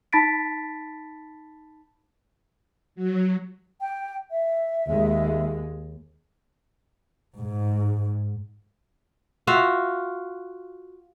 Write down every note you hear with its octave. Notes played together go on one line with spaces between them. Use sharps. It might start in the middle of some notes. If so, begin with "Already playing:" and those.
D#4 A5 B5 A6 B6 D7
F#3
G5
E5
D#2 G#3
G#2
F4 F#4 E5 F5